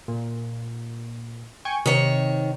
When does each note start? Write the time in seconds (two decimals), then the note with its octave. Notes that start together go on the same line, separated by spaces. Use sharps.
0.08 A#2
1.65 G5 G#5 C#6
1.86 C3 D#3 C#5